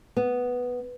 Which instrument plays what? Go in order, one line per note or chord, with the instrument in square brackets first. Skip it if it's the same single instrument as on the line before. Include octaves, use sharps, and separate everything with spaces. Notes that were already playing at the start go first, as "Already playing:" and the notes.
[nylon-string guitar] B3